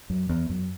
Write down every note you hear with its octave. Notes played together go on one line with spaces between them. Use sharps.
F#2
E2
F#2